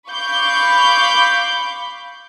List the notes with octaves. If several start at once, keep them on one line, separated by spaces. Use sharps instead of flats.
F5 B5 C#6 D6 G6